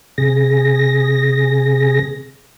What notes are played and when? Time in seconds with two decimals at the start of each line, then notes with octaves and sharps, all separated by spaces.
0.18 C3 G#4 A#6